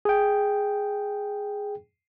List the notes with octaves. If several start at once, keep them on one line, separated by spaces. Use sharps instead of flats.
G#4 G5